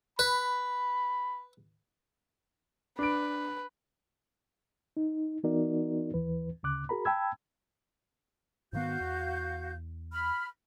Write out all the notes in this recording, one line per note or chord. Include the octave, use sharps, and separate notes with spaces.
B4 B5
D4 B4 D7
D#4
E3 B3 D#4 F#4 A#4 D5
D#2 E3 B4
D2 C#3 D6 F#6
F#4 G#4 A#4 A#5 B5
G5 A5 B5 E6 G#6
G#2 D#3 B3 F#4 F5 G6
E2
B5 F6